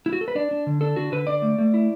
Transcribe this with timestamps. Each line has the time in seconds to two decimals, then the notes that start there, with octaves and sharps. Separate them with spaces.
0.06 E4
0.13 F#4
0.21 A4
0.28 B4
0.35 D4 D5
0.51 D4
0.67 D3
0.81 D4 A4
0.96 D3 F#4
1.12 D3 B4
1.27 D3 D5
1.42 A3
1.58 A3
1.74 E4